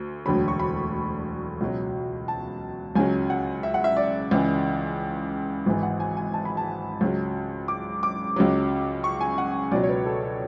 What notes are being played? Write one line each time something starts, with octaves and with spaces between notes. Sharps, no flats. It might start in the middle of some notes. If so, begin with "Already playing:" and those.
Already playing: D2
E1 D2 D3 F#3 B5
C#6
B5
C#2 B2 F#3
A5
C#2 C#3 F#3 G#5
F#5
E5
F#5
E5
D5
C#2 C#3 E3
G#1 G#2 E3
F#5
G#5
G#5
A5
B5
A5
C#2 C#3 F#3
D6
D6
C#2 C#3 F#3
C#6
G#5
F#5
C#2 B2 F#3 D5
C#5
B4
A4
A4